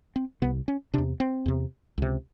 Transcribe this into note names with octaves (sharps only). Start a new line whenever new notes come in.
C4
C2 C3 B3
C#4
E2 C3 D4
C4
E2 C3
C#2 C3